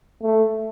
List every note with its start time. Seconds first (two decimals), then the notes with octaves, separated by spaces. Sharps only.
0.22 A3